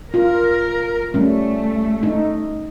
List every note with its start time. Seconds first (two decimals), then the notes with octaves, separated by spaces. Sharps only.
0.14 F4 A#4
1.14 G3 A3 C#4
2.03 D#4